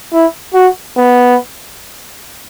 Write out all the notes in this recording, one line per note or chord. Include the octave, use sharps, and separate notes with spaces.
E4
F#4
B3